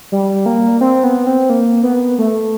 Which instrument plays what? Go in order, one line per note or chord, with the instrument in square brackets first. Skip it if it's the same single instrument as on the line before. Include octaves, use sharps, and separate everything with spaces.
[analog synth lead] G3
A#3
C4
B3
C4
A#3
B3
A3